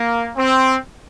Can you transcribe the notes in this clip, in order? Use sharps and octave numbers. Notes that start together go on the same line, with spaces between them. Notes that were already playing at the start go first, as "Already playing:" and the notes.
Already playing: A#3
C4